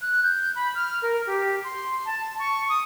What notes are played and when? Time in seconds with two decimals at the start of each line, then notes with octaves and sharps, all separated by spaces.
0.02 F#6
0.23 G6
0.56 B5
0.75 F6
1.02 A#4
1.27 G4
1.64 C6
2.06 A5
2.39 C#6
2.69 D#6